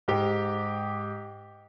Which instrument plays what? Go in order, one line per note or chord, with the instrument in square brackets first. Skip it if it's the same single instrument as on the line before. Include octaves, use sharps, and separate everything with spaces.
[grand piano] G#2 G4